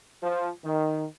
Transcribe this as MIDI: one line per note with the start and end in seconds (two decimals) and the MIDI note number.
0.22 0.49 53
0.63 1.04 51